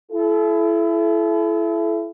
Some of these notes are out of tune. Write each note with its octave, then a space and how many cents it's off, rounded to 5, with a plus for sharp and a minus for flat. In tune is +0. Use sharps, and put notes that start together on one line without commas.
E4 +25 A4 -35